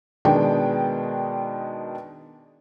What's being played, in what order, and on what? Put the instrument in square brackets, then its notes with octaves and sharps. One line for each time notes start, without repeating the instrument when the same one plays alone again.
[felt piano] B2 D#3 G#3 B3 D4 G5